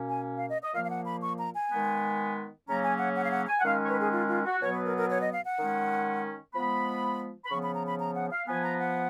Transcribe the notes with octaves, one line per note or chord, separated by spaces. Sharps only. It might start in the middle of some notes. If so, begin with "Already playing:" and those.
Already playing: B2 A#3 C#4
G#5
F5
D#5
D#5
A#2 F3 A#3 F5
F5
F#5
B5
C#6
A#5
G#5
D#3 G#3 B3
C#3 F#3 A#3 C#4 A#5
G#5
F#5
F#5
F5
F#5
G#5
F#5
D#3 G#3 C#4 F5
C#5
B4
G#4
F4
F4
F#4
B2 F#3 B3 C#5
B4
A#4
A#4
C#5
D#5
F5
F#5
D#3 G#3 C#4
F3 G#3 B3 B5
B5
C#3 F3 B3 C#6
B5
A#5
B5
A#5
F#5
F5
F3 B3 G#5
A#5
F#5